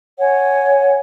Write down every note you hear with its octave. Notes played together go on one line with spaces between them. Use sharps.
C#5 F#5 G#5